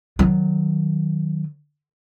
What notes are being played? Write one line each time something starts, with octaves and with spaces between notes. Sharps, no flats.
D#3 F#3